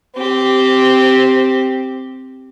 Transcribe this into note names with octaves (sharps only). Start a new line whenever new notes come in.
C4 G4